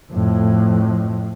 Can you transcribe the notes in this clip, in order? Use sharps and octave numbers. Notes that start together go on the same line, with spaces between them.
F2 A2